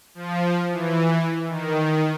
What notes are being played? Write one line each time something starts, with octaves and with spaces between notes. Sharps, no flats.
F3
E3
D#3